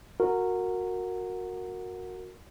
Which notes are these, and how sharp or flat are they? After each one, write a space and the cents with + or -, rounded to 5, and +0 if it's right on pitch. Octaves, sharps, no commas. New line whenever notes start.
F#4 -15 A#4 -15